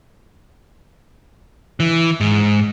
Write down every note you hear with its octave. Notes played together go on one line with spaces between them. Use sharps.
E3
G#2